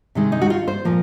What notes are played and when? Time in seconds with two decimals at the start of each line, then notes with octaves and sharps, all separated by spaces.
0.15 C3 D#3 G#3
0.32 D#4
0.42 F#4
0.50 F4
0.68 C5
0.85 A#2 F3 A#3